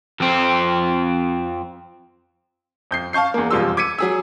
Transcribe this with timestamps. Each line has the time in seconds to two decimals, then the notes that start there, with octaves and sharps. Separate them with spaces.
0.20 F2 C4
2.91 F2 G6 C7
3.13 F5 A5 C#6 G6 C7
3.34 E2 A#3
3.51 E1 F2 G3 F4 C6 E6
3.77 D6 G#6 B6 C#7 D#7
3.99 F#3 G#4 E6